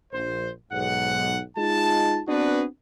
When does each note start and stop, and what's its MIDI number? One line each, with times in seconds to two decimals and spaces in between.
0.13 0.50 34
0.13 0.50 72
0.72 1.40 35
0.72 1.40 44
0.72 1.40 78
1.57 2.20 56
1.57 2.20 63
1.57 2.20 65
1.57 2.20 81
2.28 2.64 59
2.28 2.64 60
2.28 2.64 62
2.28 2.64 66
2.28 2.64 68
2.28 2.64 71